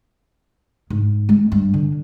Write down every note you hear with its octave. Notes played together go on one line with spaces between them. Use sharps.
G#2
G#3
G2
D3